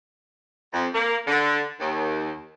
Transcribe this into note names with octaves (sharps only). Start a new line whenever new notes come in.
F2
A#3
D3
D#2